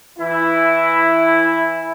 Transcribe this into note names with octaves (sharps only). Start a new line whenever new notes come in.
E3 E4